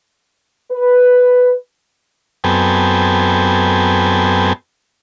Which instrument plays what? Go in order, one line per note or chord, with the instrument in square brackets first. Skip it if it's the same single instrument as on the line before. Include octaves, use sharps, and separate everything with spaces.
[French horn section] B4
[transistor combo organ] F#2 B3 C4 A4 G5 G#5